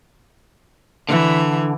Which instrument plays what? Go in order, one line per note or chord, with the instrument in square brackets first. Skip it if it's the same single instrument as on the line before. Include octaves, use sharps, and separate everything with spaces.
[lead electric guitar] D3 [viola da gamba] E3